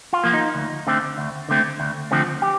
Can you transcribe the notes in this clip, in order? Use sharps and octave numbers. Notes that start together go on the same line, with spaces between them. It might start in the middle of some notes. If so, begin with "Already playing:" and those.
F4
F3 A#3
D#4
D2
D3 A3 C4
D2
D3 A3 C4
D2
D3 F3 A3 C4
G4